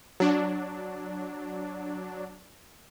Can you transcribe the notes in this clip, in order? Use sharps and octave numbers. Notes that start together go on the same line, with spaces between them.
F#3 D4